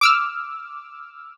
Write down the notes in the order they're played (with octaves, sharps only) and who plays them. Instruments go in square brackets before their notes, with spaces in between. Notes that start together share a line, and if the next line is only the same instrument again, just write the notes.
[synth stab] D6 E6 F6